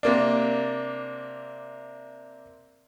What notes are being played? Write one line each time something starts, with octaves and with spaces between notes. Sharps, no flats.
C3 A#3 D4